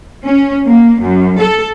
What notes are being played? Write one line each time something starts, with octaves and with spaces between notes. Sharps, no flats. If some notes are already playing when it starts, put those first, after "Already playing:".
C#4
A#3
F#2
A4